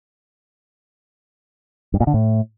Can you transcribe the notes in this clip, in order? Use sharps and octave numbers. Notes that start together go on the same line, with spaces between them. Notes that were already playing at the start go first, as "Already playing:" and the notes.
G2
A#2
D3
A2